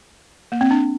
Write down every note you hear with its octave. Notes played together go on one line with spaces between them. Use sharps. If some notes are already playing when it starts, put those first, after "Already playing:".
A#3
C4
D4